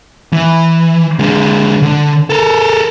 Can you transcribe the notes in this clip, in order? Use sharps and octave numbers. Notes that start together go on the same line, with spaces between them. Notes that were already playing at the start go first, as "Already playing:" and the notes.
E3
D3 G#3
D3
A4 A#4